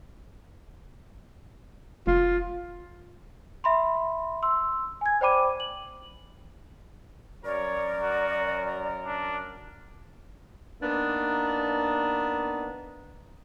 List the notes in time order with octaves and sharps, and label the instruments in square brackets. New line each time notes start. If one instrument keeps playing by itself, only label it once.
[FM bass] F1 [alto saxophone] F4
[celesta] E5 B5 C6
C6 E6
G#5 G#6
C5 D5 G5 B5 D6 D#7
F#7
[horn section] F#2 A#4 [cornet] C#5 [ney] D5
[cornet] F#4
D4
[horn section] A#3 B3 D4 D#4